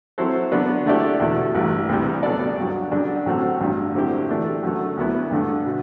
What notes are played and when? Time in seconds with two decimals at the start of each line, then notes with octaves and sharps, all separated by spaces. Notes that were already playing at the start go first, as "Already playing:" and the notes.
0.18 F#3 C4 E4 A4 C5
0.52 D3 F#3 B3 D4
0.85 D3 A3 E4 G4 D5
1.20 E2 B2 A3 E4
1.55 A1 G2 E3 G3
1.89 D2 C3 E3 G3
2.23 F#3 B3 D4 A4 D5
2.57 G2 D3 F#3
2.92 F#2 D3 G3 D4
3.26 A2 F#3 A3 C4 F#4
3.60 A1 G2 D3
3.95 D3 F#3 C4 E4 G4
4.29 E3 A3 D4 G4
4.63 F#2 D3 F#3 A3
4.97 D2 D3 F#3 B3 E4
5.31 G2 D3 A3
5.66 B2